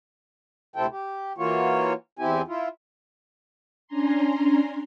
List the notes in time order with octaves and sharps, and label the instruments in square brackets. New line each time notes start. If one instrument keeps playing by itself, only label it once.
[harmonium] D2 C3 C4 E4 A4 G5
G4
E3 A#3 F4 F#4 C#5
E2 C4 E4 G4 G#5
E4 F4
[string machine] C#4 D4 G#5 A#5 C6